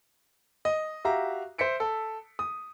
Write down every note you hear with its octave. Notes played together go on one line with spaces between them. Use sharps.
D#5
F#4 G4 E5 F5 A#5
C5 E5 B6 C#7 D7
A4
D#6